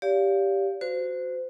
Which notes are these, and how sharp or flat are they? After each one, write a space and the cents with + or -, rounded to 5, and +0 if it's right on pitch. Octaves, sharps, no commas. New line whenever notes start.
G4 +0 D5 -40 F5 +0
F#4 -10 C5 -30